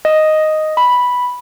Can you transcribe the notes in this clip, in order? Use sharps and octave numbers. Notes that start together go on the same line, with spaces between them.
D#5
B5